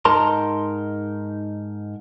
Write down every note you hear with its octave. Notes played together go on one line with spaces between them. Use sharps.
G#2 D#4 A#4 A5 A#5 C6